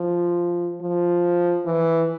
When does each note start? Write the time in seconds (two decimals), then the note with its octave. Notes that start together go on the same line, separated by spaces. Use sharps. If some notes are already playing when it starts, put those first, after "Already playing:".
Already playing: F3
0.81 F3
1.66 E3